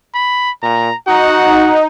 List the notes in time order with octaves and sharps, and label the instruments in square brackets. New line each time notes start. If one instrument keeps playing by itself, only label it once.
[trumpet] B5
[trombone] A#2 [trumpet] A#5
[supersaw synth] D#4 [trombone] F#4 [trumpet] F#5